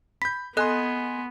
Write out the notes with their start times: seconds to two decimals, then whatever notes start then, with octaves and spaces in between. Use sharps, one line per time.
0.22 B5 G6 B6
0.57 B3 A4 D#5 G#5 C6 F#6